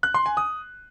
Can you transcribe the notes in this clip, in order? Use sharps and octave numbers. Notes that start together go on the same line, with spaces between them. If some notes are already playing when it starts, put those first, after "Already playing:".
F#6
C6
G#5
D#6